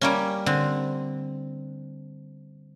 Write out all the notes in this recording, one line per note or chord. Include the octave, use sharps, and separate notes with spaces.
G3 A#3 C#4
D3 C4